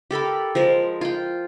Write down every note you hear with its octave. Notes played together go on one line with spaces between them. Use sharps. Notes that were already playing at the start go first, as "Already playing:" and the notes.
G4 A4 A#4 B5
F3 G#3 A#4
F4 G5